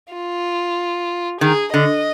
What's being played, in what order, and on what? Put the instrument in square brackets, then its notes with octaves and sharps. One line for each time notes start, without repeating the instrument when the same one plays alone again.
[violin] F4
[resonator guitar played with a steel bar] D#3 [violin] G#4
[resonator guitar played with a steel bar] D3 [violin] D#5